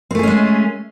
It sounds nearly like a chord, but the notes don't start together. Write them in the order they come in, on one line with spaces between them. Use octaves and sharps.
C4 A3 G#4 C#4 G#3